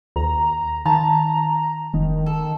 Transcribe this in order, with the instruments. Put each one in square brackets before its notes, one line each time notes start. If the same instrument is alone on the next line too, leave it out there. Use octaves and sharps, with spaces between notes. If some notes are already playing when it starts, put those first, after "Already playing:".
[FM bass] D#2 [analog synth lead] A#5
[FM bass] D#3 [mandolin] A5 [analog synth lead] A#5
[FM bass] F1 [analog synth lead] D#3
[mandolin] A4